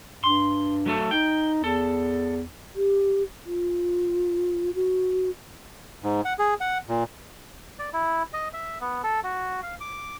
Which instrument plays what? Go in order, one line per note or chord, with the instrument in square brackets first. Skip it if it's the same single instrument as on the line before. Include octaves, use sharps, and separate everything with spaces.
[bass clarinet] G2 [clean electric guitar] C6
[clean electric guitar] F#3 A3 A4
[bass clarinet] D#4 [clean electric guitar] G5
[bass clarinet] E2 [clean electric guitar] A4
[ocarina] G4
F4
F#4
[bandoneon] G#2
F#5
G#4
F#5
A#2
[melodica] D5
E4
D#5
E5
B3
A4
F#4
F5
D6